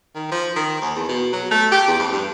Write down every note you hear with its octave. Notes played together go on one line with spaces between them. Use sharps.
D#3
F3
D#3
D#2
E2
B2
F#3
A3
G4
E2
F2
G2